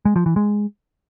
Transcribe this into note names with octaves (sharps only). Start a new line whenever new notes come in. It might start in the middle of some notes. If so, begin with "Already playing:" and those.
G#3
F3
E3
G#3